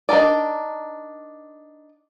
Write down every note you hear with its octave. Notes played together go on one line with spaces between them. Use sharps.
D4 D#4 A#4 D5